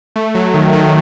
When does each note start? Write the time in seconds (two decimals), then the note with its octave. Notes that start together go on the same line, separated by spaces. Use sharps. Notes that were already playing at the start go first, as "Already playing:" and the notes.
0.16 A3
0.35 F#3
0.54 D#3
0.73 D#3